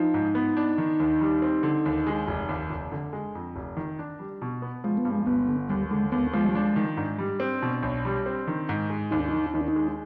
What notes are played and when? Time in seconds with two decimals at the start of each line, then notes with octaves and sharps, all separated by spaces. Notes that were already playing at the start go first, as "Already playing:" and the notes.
Already playing: F3 D#4
0.14 G#2
0.35 B3
0.57 D4
0.78 D#3
1.00 D#2
1.21 G3
1.42 C4
1.63 D3
1.85 D#2
2.07 G#3
2.27 F1
2.49 D#2
2.70 F1
2.92 D3
3.13 G#3
3.35 F2
3.56 F1
3.77 D#3
3.99 D4
4.19 G3
4.42 B2
4.62 B3
4.84 F3 G#3
4.97 B3
5.05 G2
5.11 G#3
5.26 G1 B3
5.48 D3
5.69 D#2 G3
5.91 D3 G#3
6.12 D#2 B3
6.33 F3 G#3
6.45 G3
6.55 G#3 D4
6.76 D#3
6.97 G#2 D4
7.18 G3
7.40 C4
7.62 B2
7.82 B1
8.05 G3
8.26 C4
8.47 D#3
8.69 G#2
8.90 G#3
9.11 D#2 D#4
9.20 D4
9.29 D#3 D#4
9.54 D#2 D#4
9.61 D4
9.68 D#4
9.76 G#3